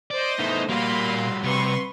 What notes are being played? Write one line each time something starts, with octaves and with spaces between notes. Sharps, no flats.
C5 D5 D#5
A3 B3 D#4 E4
A#2 G3 A#3 F#4 F5 B5 C6
C3 B4 C6 C#6